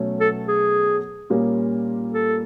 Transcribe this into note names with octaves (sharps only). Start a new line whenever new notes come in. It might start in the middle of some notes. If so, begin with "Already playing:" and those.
Already playing: B2 F#3 A3 C#4
A4
G#4
A#2 G3 A#3 C#4
A4